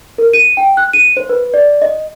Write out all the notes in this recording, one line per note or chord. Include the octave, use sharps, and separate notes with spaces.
A#4
D#7
G5
F#6
D#7
C5
B4
D5
D#5